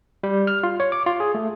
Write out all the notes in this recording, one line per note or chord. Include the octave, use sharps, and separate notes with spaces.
G3
F6
F4
C#5
D6
F4
G#4
A3